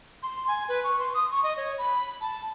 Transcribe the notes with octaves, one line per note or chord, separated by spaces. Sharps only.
C6
G#5
B4
C#6
C6
D#6
C#6
D#5
C#5
B5
A5